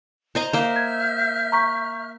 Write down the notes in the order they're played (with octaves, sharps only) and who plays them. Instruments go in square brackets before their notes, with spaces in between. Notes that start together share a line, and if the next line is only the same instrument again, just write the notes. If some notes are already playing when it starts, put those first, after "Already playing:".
[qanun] C5 D#5 A#5
[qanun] A#3 C5 [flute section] E5 F6 G6
[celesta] G#6
A#5 C#6 B6